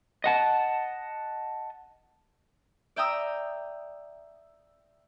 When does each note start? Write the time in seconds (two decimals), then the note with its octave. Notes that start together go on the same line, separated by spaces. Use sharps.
0.24 D#5 F#5 A5
2.96 D5 E5 G5 A#5 D#6 E6